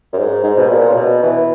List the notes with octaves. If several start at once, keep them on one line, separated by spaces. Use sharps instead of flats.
F#2
G#2
G#2
B2
A#2
C#3
B2
E3